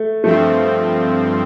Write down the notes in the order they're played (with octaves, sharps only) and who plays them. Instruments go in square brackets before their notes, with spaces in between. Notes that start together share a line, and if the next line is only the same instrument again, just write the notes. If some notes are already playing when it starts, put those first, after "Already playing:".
Already playing: [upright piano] A3
[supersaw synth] G2 F3 C4 [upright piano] A3